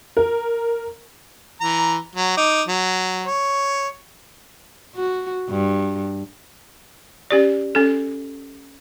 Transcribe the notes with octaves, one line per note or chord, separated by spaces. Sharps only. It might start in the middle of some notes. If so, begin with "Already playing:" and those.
A#4
E3 A#5
F#3
D#4 D6
F#3
C#5
F#4
G2
C#4 G4 D5
C#4 A4